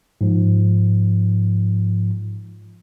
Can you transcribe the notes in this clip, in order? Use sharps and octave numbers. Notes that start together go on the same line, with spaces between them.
G#2 F3